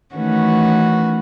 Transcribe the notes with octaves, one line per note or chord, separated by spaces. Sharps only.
D#3 E3 A3 C#4 F#4 B4